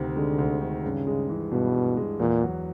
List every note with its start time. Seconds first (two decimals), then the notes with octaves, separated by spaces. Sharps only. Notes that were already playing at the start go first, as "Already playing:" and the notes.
Already playing: D2 C3 D#3
0.16 D3 G#3
0.38 D2
0.61 D#3
0.83 G2 C#3
1.07 G#3
1.29 E3
1.52 G2 B2
1.74 G2
1.97 G#3
2.19 E2 A#2
2.42 F#3